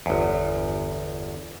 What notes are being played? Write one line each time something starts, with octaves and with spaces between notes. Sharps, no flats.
G1 E2